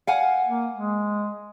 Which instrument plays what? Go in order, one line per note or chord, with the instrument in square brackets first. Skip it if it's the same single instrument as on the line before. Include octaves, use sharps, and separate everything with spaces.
[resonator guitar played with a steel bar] F5 F#5 G#5
[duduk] A#3
G#3